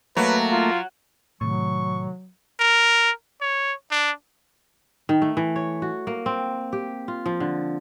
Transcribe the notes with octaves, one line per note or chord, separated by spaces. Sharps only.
F#3 A3 A#3 B4
F4
A2 C3 D#3 F#3 A3 C#6
A#4
C#5
D4
D#3
A3
E3
C#5
F#4
A#3
C4
G4
F4
F3
D3